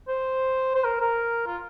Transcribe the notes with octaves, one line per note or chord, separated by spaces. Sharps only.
C5
C5
A#4
A#4
F4